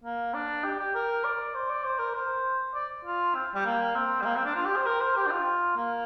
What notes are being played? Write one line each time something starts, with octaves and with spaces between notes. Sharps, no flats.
A#3
D4
G4
G4
A#4
D5
C5
D5
C5
A#4
C5
D5
F4
C4
G3
A#3
C4
G3
A#3
C4
D4
F4
G4
C5
A#4
C5
G4
D4
F4
A#3